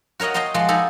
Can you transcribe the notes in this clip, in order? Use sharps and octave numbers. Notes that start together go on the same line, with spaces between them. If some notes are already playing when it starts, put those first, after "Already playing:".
F#4 A#4 C#5 D#5 F#5
D#5 G5 A5 A#5 C6
F3 G#3 F#4 D5
D#4 A4 D5 G#5 A#5 B5